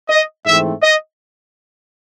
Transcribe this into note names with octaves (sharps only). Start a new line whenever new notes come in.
D#5
G#2 E3 A3 C4 E5
D#5